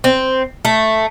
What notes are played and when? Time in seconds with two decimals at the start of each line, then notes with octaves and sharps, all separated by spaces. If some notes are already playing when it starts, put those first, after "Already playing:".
0.04 C4
0.65 A3